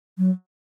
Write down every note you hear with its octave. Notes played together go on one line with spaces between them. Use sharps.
F#3